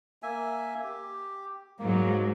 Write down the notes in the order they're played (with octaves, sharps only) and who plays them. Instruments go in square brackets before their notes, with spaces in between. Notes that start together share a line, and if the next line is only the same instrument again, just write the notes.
[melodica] A#3 E5 G#5
G4
[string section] G#2 F#3 [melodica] A#3